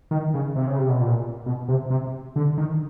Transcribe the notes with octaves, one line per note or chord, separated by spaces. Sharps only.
D#3
C#3
C3
C#3
C3
B2
A#2
B2
C3
C3
D3
D#3